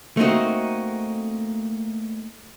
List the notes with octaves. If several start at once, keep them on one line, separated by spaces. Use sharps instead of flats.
A3 A#3 C4 D#4 F#4